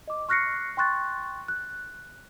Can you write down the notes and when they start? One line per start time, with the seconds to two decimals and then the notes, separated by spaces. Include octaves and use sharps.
0.08 D#5 D6
0.29 C#6 F6 F#6 A#6 C7 C#7
0.77 G5 C6 C#6 F#6 A6
1.48 F#6